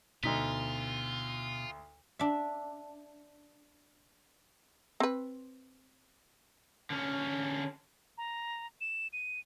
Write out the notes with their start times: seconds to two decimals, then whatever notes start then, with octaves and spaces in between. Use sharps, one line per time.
0.23 D2 B2 D#4 F4 B6
2.19 D4 E5
5.00 C4 B4
6.90 D3 C#4
8.18 A#5
8.81 E7
9.13 D#7